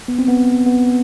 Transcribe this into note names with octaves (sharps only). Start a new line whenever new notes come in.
B3
C4
B3
B3